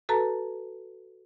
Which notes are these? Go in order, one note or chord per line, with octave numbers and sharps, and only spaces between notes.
F#4 A4 B4 A5 A#5